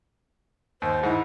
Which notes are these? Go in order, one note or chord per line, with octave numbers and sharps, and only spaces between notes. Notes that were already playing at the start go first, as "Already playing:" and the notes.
D#2 C5
G#2 E4